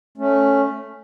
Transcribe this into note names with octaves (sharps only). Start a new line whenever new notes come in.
A3 C#4